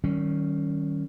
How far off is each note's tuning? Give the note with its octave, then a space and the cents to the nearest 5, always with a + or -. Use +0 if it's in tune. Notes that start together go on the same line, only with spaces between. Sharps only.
D#3 +0 G3 -35 C#4 +0